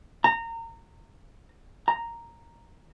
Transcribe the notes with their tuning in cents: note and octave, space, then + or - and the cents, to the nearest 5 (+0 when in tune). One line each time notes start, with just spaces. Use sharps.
A#5 -25
A#5 -5